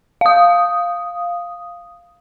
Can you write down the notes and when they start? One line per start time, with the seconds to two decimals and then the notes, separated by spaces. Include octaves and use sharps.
0.21 F5 D#6